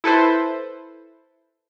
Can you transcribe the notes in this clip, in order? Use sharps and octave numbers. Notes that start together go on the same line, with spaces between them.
E4 A4 B4 C5